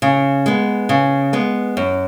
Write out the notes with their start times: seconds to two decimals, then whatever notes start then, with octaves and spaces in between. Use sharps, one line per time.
0.02 C#3
0.46 G#3 B3
0.89 C#3
1.33 G#3 B3
1.77 F#2